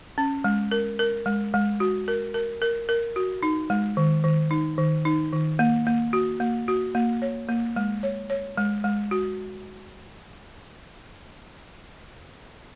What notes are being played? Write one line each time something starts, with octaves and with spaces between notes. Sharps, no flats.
C#4
G#3
A#4
A#4
G#3
G#3
F#4
A#4
A#4
A#4
A#4
F#4
D#4
G#3
D#3
D#3
D#4
D#3
D#4
D#3
A#3
A#3
F#4
A#3
F#4
A#3
C#5
A#3
G#3
C#5
C#5
G#3
G#3
F#4